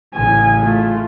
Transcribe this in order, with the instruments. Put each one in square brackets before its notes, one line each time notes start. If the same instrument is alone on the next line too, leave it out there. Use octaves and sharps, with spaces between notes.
[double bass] A1 C#3 [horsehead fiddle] G#5
[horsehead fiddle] A3 F4